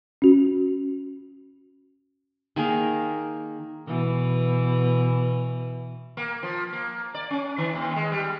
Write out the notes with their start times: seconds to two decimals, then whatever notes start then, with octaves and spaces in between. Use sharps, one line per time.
0.22 C#4 F#4
2.56 D#3 A#3 G#4 A#4
3.87 B2 E3
6.17 A#3
6.43 F3
6.73 A#3
7.14 D5
7.31 C#4
7.58 D#3
7.75 D#2
7.96 G#3
8.12 G3